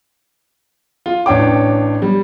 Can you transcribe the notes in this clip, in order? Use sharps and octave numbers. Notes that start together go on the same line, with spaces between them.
F4
A1 D4 C#5 G5 D6
G3